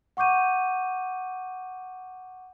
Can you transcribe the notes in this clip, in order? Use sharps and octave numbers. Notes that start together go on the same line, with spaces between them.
F#5 C#6 D6 G6 D#7